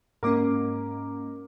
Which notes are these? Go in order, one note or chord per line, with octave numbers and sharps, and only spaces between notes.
G#2 A#3 C#4 A#4 D6